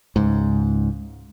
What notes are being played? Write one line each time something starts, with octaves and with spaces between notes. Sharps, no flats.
C#2 G#2